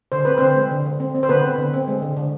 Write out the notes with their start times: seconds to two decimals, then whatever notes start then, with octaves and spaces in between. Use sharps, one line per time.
0.12 D3 C5
0.25 C4 B4
0.38 D3 C4 C5
0.56 G#3
0.71 D3
0.86 D3
1.00 C4
1.15 C4
1.23 C5
1.29 D3 B3 B4
1.43 C4
1.58 D3
1.74 C4
1.88 G#3
2.02 D3
2.17 D3